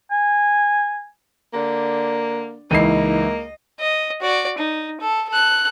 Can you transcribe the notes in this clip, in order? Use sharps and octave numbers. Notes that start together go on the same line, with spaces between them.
G#5
D3 A#3
C#2 E3 A#3 D#4 E4 D#5 C7
D#5
F#4 D5
D#4
A4
A4 F#6